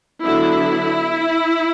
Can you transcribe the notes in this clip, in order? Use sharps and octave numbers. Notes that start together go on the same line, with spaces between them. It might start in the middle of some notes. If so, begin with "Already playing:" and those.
D3 F#3 B3 D4 E4